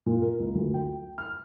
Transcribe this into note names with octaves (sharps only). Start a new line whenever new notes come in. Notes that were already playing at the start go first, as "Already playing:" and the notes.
A#2
A#4
C#2
D2
G5
F6